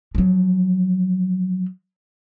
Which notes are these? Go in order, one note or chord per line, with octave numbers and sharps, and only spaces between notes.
F3 F#3